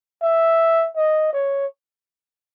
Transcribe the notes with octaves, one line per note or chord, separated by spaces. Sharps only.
E5
D#5
C#5